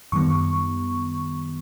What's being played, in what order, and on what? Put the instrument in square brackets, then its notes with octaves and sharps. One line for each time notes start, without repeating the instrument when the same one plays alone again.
[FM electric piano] F#2 D#3 G3 B3 C#6